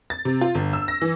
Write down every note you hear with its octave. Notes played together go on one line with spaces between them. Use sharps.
A6
C3
F4
G1
E6
A#6
E3